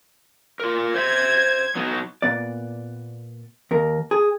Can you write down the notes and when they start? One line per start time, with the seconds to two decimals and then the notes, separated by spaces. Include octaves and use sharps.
0.60 F4 A#4
0.94 C5 E5 G#6
1.75 F#3 B3 D#4
2.22 A#2 B3 D5
3.71 D#2 A#4
4.11 G#4